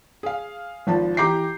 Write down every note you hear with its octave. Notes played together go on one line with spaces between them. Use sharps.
G#4 F5
G#1 F3 A5
E3 G4 A#5 D6 G6 C7